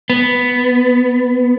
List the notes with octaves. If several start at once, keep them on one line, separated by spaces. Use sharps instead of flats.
B3